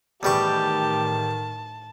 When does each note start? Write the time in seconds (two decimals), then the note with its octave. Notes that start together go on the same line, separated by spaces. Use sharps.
0.23 E2 A2 D#3 G3 G4 A5 C#6